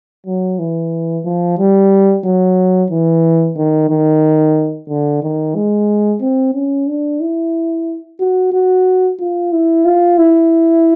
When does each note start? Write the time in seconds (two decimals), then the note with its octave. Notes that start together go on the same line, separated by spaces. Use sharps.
0.27 F#3
0.59 E3
1.25 F3
1.59 G3
2.25 F#3
2.91 E3
3.57 D#3
3.90 D#3
4.89 D3
5.23 D#3
5.56 G#3
6.21 C4
6.55 C#4
6.88 D4
7.21 E4
8.20 F#4
8.53 F#4
9.20 F4
9.53 E4
9.85 F4
10.18 E4